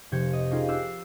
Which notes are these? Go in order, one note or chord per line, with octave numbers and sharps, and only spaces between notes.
F1 C3 G6 G#6 C#7
D#5
C#4 D#4 F4 G4 G#4 A#4
D6 E6 F#6 G6 C7 D7